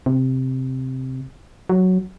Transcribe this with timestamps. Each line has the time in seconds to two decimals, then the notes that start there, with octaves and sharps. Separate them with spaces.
0.06 C3
1.69 F#3